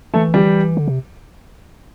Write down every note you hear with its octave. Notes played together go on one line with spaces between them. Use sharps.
E3 A3 A4
G3 G4
D3
C3